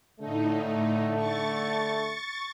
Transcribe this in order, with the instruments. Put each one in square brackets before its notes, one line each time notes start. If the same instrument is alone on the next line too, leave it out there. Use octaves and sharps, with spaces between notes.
[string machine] A2 D#4 [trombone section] D3 A3
[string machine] C#6 A6